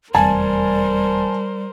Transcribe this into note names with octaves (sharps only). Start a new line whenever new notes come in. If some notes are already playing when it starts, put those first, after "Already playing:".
F1 E2 G3 A#4 C5 G#5 A5